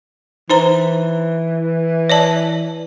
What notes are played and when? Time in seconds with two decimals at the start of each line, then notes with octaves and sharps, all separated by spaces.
0.50 E3 D#4 C5 A#5
2.10 C#5 D5 A5